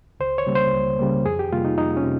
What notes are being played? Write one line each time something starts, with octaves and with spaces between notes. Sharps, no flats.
C#2 C5
C#5
C#3 G3 A#3
C5
C#2
C#3 G3 A#3
F2 G#4
G4
C3 G3 A#3 F4
D#4
F2 D#4
C#4
C3